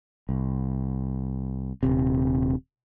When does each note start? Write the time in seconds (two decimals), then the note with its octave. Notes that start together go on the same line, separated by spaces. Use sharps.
0.29 C2
1.83 D#1 G#1 C3